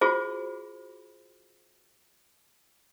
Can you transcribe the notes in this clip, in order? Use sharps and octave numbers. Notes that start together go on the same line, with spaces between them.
F4 F#4 G#4 C5